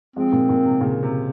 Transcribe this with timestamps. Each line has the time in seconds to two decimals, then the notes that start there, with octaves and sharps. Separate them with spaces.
0.16 F3 G#3 C4
0.33 A#2
0.49 A#2
0.65 C3
0.81 A#2 C#3
1.03 C3